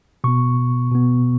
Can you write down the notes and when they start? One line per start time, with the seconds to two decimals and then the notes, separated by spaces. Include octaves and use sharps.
0.24 B2 B3 C#6
0.91 B2 B3